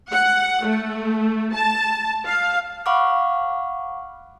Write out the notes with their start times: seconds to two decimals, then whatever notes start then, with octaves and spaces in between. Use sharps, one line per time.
0.12 F#5
0.66 A3
1.54 A5
2.25 F5
2.86 F5 F#5 B5 C#6 D6 F6